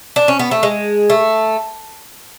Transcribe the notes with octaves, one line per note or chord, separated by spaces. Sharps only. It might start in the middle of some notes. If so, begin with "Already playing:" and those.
D4
C#4
B3
A3
G#3
A3